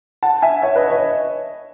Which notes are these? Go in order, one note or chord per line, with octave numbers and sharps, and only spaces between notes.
F#5 A5
E5 G#5
C#5 E5
B4 D#5
C#5 E5